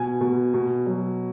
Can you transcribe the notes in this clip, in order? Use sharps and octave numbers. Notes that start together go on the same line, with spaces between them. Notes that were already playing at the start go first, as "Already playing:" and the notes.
Already playing: B2 G#5
B2
B2
F#3